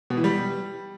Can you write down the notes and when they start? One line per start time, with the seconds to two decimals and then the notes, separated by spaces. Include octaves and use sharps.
0.10 B2
0.17 E3
0.24 G3